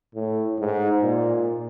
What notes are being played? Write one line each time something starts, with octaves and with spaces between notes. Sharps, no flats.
A2
G#2
A#2